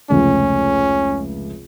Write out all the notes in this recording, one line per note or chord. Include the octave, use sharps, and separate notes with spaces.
F1 C#2 A3 C#4